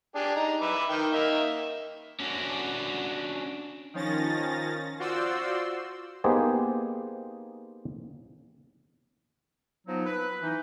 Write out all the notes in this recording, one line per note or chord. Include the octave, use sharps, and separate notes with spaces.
D4 G4 G#4
D#4 A#5
B4 E5 D6
D#3 G5
A#3 D#4 E5
C#4 D4 F#4
D#3 F3 C#4 A6 A#6
F4 F#4 C5 D5 C6 E6
A#3 B3 D#4 G4 G#4 C5
F3 F#3 B3 D#4
B4
E3 D#4